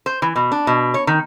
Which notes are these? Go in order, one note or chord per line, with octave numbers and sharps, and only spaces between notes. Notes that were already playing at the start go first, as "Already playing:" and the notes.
C5
E3
B2
D4
B2
C#5
D#3